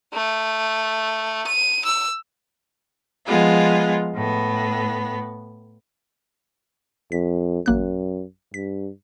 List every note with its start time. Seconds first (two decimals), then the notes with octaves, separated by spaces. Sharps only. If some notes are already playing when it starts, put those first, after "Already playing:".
0.14 A3
1.47 D#7
1.85 E6
3.26 F3 G#3 B3 F4
4.15 A2 B3
7.12 F2 B6
7.66 A1 F#2 A#3 F#6
8.54 G2 B6